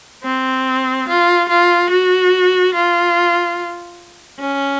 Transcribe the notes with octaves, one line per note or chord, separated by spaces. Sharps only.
C4
F4
F4
F#4
F4
C#4